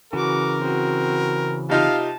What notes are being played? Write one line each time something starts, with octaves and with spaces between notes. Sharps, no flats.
C#3 E3 F#4 A#4 D6
C4 F#4
C3 D#4 F4 F5 A5